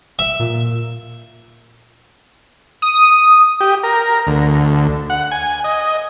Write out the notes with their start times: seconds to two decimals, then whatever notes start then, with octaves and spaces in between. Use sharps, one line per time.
0.19 E5
0.39 A#2
2.82 D#6
3.61 G4
3.83 A#4
4.27 D2
5.10 F#5
5.31 G#5
5.64 D#5